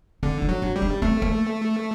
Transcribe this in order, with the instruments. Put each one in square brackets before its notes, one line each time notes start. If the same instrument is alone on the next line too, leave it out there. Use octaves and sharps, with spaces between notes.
[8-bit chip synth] D3 [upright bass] C4
[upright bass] D4
[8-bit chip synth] F#3
[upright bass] D4
[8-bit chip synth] G3
[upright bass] D4
[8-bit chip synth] A3 [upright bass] C4
[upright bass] A#3